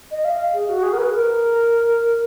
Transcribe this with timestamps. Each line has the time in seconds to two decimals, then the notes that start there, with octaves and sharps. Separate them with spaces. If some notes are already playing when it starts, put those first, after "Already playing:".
0.11 D#5
0.25 F5
0.54 G#4
0.69 F#4
0.83 G#4
0.93 A#4
0.98 B4
1.12 A#4